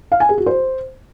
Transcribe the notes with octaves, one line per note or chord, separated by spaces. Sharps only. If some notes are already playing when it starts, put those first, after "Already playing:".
F5
G#5
G#4
F#4
C5